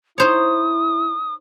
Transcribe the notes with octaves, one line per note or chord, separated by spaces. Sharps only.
D#4 E4 C5 C#5 D#6